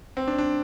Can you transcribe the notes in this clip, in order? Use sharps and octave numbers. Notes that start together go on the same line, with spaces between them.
C4
D4
D4